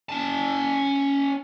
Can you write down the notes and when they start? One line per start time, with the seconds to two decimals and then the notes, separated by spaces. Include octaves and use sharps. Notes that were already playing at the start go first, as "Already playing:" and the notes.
0.09 C#4 A5